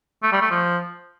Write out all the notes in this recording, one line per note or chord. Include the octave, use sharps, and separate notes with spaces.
A3
G3
A3
F3